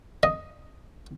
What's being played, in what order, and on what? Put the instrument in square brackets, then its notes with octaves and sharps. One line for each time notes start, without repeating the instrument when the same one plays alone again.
[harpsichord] D#5